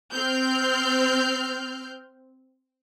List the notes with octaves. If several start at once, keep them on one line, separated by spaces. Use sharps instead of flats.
C4 F6 G6